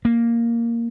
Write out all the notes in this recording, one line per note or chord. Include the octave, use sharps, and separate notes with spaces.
A#3